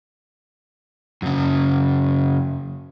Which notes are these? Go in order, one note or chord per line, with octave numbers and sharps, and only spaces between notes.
F#2 C#3